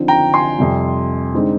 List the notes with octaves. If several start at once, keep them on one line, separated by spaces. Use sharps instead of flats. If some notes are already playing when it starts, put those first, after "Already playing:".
Already playing: D3 F3 C4 D#4
G5 A#5
G#5 C6
F2 C3 G3
D3 G#3 C4 D#4